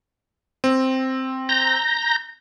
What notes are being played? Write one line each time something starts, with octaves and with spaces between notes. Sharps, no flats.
C4
A#5 G6 A#6